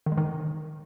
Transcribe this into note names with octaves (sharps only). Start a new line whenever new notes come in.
D#3
G#3
D#3